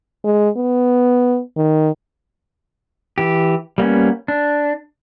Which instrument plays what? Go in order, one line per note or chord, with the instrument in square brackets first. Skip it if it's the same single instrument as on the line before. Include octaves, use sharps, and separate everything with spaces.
[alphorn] G#3
B3
D#3
[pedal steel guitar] E3 G4
G3 A#3 B3 C#4
D4